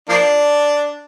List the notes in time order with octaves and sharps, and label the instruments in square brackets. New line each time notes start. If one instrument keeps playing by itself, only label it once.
[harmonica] F3 A#3 D4